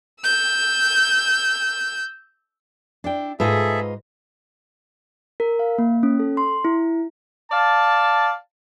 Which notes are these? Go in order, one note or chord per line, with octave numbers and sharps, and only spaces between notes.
E6 G6
D4 E4 G5
G#2 F4 G#4 A4 B4 D#5 E5
A#4
F5
A#3
C#4
A4
C6
E4
D5 F5 A5